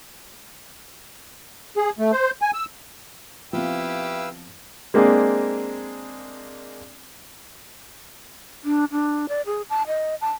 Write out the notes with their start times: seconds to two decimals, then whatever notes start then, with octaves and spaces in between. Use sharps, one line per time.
1.77 G#4
1.99 A3
2.12 C5
2.42 G#5
2.54 E6
3.53 F3 B3 C4 E4 G4 B4 F5 E6
4.94 G#3 A#3 C4 D4 G#4
8.65 D4
8.92 D4
9.29 D5
9.46 G#4
9.70 A5
9.87 D#5
10.21 A5